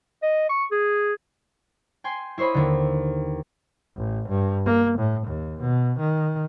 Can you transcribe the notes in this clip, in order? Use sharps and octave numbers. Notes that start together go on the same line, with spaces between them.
D#5
C#6
G#4
G5 G#5 C6
E4 C5 C#5 D#5 B5
D#2 D3
A1
G2
A#3
A2
D#2
B2
D#3